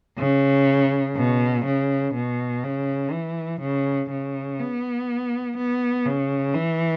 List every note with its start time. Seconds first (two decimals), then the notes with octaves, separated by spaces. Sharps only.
0.19 C#3
1.16 B2
1.65 C#3
2.14 B2
2.63 C#3
3.12 E3
3.61 C#3
4.10 C#3
4.59 B3
5.57 B3
6.06 C#3
6.54 E3